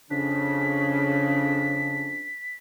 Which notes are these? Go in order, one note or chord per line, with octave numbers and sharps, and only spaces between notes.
F2 C#3 C#4 D4 B6